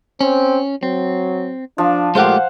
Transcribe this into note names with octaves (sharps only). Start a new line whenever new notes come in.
C4 C#4
F#3 C4
F3 D4
A#2 G#3 A3 G4 C5 F5 F#5